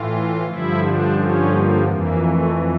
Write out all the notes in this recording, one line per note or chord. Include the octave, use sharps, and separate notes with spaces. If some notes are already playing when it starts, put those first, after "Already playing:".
Already playing: A2 E3 F4
G2 D3 F3 E4
D4
C#4
A#3
F2 E3 A#3
A3